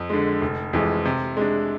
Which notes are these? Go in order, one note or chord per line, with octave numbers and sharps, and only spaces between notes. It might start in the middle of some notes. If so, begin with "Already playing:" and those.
Already playing: F2
D3 G#3
F1
F2 E3 G#3
C3
G#3 D4